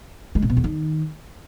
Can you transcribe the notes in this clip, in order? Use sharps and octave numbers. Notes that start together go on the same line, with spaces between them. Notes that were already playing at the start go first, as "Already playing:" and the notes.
G#3
C3
B2
E2
D#3